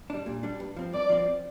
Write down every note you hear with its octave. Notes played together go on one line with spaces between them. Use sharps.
G3 D4
A#2
G3 D4
G2
F3 C4
G2 D5
F3 C4